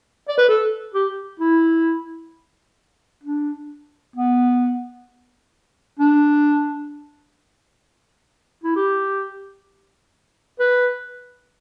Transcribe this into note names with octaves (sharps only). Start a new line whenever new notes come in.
D5
B4
A4
G4
E4
D4
B3
D4
E4
G4
B4